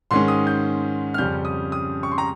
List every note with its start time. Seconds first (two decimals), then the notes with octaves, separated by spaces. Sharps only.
0.11 G#2 D#3 G#3 C#4 C6
0.28 D#6
0.47 G6
1.14 F6
1.18 F2 C#3 G3 C#4 G6
1.45 D#6
1.72 D#6
2.03 C#6
2.12 C6
2.18 A#5